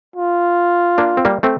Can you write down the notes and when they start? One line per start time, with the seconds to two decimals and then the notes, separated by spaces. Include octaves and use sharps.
0.16 F4
0.98 A#3 D4
1.17 C4
1.25 G3 A#3
1.43 A3 C4